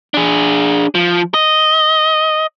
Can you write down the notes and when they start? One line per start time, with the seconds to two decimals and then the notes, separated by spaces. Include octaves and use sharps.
0.14 D4 G#4
0.95 F3
1.34 D#5